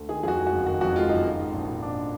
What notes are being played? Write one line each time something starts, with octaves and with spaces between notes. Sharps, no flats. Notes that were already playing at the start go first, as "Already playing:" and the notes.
Already playing: D2
D#3 G#4
F2 F#4 G#4
G#3
F#4
F#1
D#3 F#4
F2 F#4
G#3 F4
F#1 D#4
D#3
G#2
A#1
A#1
D#3 D4